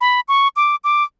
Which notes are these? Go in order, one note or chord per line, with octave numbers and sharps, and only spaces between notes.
B5
C#6
D6
D6